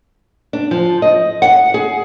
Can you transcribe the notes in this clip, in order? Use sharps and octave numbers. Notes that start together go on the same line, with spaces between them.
D4
F3
D#5
F#5
G#4